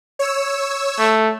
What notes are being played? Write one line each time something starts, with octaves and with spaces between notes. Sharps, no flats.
C#5 E6
A3